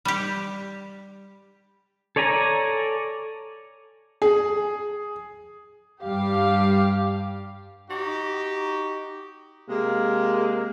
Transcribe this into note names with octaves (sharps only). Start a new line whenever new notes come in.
G3 G4
A4 C#5 D5 G#5 A#5
G#4
G2 G3 G4 F5
D#4 F#4 G4
C3 G#3 A#3